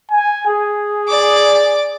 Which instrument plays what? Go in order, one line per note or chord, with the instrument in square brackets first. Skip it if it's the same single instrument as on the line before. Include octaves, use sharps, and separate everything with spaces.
[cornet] G#5
G#4
[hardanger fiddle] D5 D6